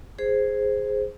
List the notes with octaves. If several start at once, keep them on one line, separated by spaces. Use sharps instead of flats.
G#4 C5